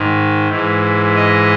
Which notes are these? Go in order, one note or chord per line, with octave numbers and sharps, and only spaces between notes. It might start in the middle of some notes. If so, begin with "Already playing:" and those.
Already playing: G#2 D#3
G#2 E3
D#5